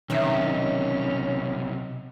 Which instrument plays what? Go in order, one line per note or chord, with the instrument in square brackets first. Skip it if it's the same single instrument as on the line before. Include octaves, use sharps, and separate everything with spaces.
[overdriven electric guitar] B1 C3 [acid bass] D#3 [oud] E3 F#3 E5 [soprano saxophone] C#4